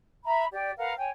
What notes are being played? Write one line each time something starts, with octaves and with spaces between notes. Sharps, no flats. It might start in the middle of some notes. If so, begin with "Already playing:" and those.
E5 A#5 B5
G4 D5 G5
A#4 B4 F5 F#5
C#5 G5 G#5